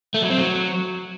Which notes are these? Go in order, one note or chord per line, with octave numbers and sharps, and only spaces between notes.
A3
F#3
C4
F#3